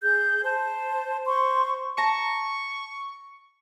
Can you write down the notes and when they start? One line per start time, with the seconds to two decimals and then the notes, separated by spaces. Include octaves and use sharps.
0.03 G#4 G6
0.44 C5 A5
1.27 C5 C6 C#6
1.98 A5 A#5 C#6